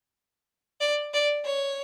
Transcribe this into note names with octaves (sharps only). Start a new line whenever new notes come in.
D5
D5
C#5